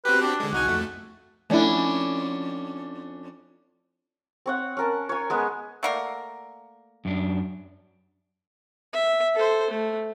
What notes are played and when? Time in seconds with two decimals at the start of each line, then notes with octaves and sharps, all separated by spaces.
0.05 C4 F#4 G4 B4
0.21 D4
0.40 D3 G#3
0.53 C2 D#4 F#4 G#5
0.67 F2 A3
1.50 F2 A3 C#4 D4 E4
4.46 C4 C#5 F#5
4.77 C#4 A#4 A5
5.09 C#5 G#5
5.30 G#3 B3 A#4
5.83 A3 A#3 A#4 D5 F#5 C#6
7.05 F#2 D4
8.93 E5
9.35 A4 C5
9.70 A3